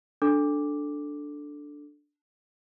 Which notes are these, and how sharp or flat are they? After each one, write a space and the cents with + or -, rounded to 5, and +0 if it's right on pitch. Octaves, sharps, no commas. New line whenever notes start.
D4 +0 A4 -5 D6 +0